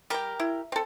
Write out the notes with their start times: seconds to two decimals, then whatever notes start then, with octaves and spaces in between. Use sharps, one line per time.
0.10 G3 G4 A#4 G5 A#5
0.40 E4
0.72 C4 A4